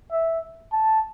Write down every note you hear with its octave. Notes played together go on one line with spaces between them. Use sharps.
E5
A5